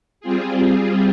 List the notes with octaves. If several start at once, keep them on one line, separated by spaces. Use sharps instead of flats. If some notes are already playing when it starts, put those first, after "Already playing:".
G3 C4 F4 G#4